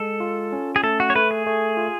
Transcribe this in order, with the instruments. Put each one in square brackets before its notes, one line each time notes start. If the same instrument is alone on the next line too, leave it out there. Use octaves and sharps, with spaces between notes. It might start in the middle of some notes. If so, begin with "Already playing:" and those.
Already playing: [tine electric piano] G#3 [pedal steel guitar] A4
[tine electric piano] F4
C#4
[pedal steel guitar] G#4
[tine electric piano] A3 [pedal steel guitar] A4
[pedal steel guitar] F#4
C#5
[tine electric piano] A3 [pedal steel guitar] B4
[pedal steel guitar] G#4
[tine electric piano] A3
F4